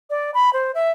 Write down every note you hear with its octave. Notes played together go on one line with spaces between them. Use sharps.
D5
B5
C5
E5